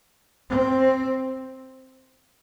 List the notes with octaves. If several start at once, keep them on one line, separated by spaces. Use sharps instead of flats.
C4